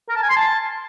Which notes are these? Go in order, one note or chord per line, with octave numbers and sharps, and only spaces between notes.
A#4
A5
G#5
C6
A5